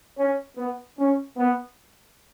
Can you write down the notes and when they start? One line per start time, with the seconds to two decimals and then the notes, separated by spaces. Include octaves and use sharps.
0.17 C#4
0.56 B3
0.97 C#4
1.37 B3